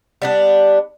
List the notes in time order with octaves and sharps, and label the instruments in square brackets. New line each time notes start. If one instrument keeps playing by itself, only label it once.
[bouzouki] G3 B3 D4